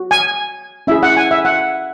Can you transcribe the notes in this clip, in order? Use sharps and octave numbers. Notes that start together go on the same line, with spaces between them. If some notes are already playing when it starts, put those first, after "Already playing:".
Already playing: F#4
G#5
C#4 E4 G#4 E5
F#5
G#5
E5
F#5